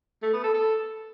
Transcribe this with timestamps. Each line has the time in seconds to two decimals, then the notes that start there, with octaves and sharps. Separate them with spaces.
0.23 A3
0.33 B3
0.44 A4
0.54 A4